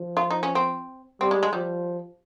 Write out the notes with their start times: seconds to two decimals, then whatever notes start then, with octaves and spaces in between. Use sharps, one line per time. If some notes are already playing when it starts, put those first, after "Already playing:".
Already playing: F3
0.17 F4
0.31 D#4
0.43 C#4
0.55 C4
1.21 G3 C4
1.31 G#3
1.43 G#3
1.53 F3 G3